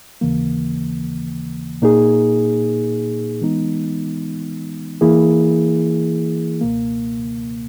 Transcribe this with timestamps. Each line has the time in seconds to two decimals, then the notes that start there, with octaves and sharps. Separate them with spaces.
0.21 D#2 C#3 E3 A#3
1.82 A#2 A#3 D#4 G#4
3.41 E3 G#3 B3 D#4
5.01 E3 A#3 E4 G#4
6.61 C#2 B2 A#3